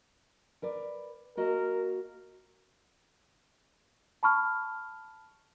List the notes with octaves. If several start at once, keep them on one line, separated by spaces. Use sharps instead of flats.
A#4 B4 D5
A#3 F#4 A#4 D#5
A5 B5 C#6 F6